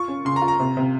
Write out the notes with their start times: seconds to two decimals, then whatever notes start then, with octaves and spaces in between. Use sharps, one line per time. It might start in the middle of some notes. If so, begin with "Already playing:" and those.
Already playing: F4 C#6
0.08 C#4
0.25 C#3 C6
0.36 A#5
0.42 F4
0.48 A#5
0.60 C3
0.77 C3